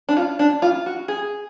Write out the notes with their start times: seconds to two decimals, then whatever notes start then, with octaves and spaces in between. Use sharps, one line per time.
0.09 D4
0.17 F4
0.39 D4
0.62 F4
0.86 F#4
1.08 G#4